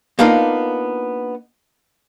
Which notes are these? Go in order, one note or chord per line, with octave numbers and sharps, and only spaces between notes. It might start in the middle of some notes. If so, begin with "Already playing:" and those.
A#3 B3 D4 D#4 F4 A#4